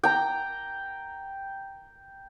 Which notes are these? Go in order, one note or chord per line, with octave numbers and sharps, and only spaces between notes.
G5 A#5